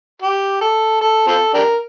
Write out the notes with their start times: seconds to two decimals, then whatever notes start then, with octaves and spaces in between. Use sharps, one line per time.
0.22 G4
0.61 A4
1.01 A4
1.27 C4 F4 A4
1.54 D4 G4 A#4